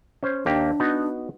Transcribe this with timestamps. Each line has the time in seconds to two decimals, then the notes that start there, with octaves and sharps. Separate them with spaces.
0.23 C#4 C5
0.46 D#2 A#3 D4 G4
0.80 B3 D#4 F#4